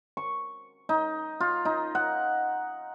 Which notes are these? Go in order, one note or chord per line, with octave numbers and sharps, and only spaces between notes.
C#6
D#4
F4
D#4
F#5